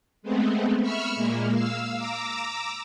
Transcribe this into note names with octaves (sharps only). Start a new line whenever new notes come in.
G#3 A3 B3 C4
E5 B5 C#6 E6 F6
A#2 G#3 A#3
F5 E6
A#5 D6 E6